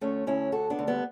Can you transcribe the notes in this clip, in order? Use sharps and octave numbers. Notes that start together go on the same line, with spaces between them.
D2 A3 C#4
D2 C#4 E4
D2 F#4 A4
B3 D4
D2
G3 B3